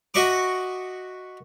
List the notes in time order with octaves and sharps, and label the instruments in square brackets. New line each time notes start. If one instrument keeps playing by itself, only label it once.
[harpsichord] F#4 D#5 E5 C#6 D6